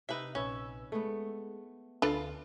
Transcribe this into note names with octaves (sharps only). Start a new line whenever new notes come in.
C3 D#4 B4 E5
A#1 C#4 B4 E6
G#3 A3 B3
D2 D4 F4 A4 B4